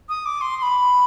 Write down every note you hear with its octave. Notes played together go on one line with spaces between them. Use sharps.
D#6
D6
C6
C6
B5